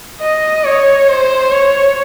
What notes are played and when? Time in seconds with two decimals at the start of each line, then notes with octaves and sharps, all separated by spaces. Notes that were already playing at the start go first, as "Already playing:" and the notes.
0.21 D#5
0.64 C#5
1.08 C5
1.52 C#5